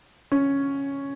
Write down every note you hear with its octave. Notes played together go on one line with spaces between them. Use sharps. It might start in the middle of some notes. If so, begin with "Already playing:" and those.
C#4